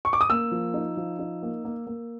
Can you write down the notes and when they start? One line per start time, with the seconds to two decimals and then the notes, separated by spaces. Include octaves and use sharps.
0.05 C#6
0.13 D6
0.21 D#6
0.30 A#3 E6
0.52 F3
0.74 D#4
0.97 F3
1.19 D#4
1.43 A#3
1.65 A#3
1.87 A#3